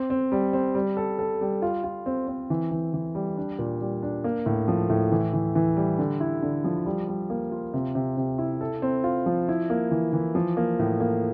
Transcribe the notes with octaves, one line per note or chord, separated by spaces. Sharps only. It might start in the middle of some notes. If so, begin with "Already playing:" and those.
Already playing: C4
C4
G3
C4
G3
A4
A4
G3
F4
F4
C4
C4
E3
E3
E3
G3
D4
A#2
G3
D4
A#3
A2
F3
A2
E3
E3
E3
G3
D3
E4
D3
F3
G3
G3
A#3
F4
C3
C3
C3
E4
A4
C4
F4
F3
E4
A#3
E3
E3
F3
A#3
A2
A#3